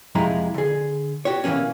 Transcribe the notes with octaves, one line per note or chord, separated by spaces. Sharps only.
F2 C3 G#3 E4 A#5
D3 G#4
F#4 G4 C#5
B2 E3 F#3 A#3 C#4